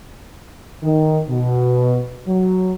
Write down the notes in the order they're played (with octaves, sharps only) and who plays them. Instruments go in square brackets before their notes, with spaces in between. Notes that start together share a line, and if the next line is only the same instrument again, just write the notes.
[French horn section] D#3
B2
F#3